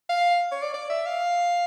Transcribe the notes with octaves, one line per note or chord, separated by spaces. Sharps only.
F5
C#5
D5
D5
E5
F5